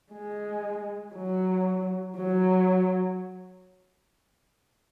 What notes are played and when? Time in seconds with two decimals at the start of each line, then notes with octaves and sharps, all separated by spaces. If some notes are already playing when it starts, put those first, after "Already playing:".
0.12 G#3
1.15 F#3
2.17 F#3